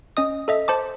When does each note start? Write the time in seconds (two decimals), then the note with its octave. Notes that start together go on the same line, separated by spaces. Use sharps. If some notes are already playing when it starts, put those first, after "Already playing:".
0.17 C#4 D#5 D#6
0.48 A4 D#5 E5
0.68 C5 A5 D6